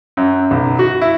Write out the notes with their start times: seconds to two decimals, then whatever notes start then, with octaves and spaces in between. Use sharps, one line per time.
0.17 F#2
0.51 B1
0.79 F#4
1.01 E4